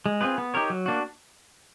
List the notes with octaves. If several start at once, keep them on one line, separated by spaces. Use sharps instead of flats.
G#3
C4 F4 G#4 B4
B3
D#4 G4 A#4 C#5
F#3
A#3 D4 F#4